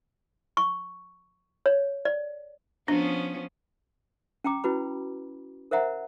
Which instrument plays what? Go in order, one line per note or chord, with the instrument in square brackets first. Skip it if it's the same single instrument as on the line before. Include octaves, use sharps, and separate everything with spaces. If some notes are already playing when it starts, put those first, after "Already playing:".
[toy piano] C#6
C#5
D5
[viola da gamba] F3 B3 C#4 [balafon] D4
[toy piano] C#4 G5 A#5 D6
C#4 E4 F#4 B4 B5
A#4 C5 E5 F#5 A#5